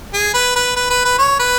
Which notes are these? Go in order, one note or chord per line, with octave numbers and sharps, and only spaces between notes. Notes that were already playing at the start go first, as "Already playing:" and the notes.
G#4
B4
B4
B4
B4
B4
C#5
B4